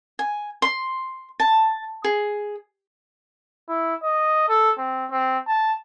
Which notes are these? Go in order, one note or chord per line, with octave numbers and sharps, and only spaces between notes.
G#5
C6
A5
G#4
E4
D#5
A4
C4
C4
A5